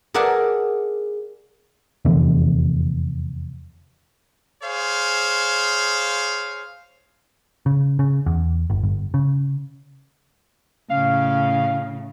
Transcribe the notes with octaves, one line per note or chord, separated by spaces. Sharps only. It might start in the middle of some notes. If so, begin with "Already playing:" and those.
G#4 A#4 D5 E5 F#5 A5
F1 E2 D3
G#4 C5 C#5 F5
C#3
C#3
E2
G1
G1
C#3
A2 C#3 F5